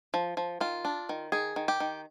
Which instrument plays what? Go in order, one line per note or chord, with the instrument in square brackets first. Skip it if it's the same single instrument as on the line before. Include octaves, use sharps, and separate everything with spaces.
[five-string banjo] F3
F3
D#3 F4
D4
D#3
D#3 G#4
D#3
G4
D#3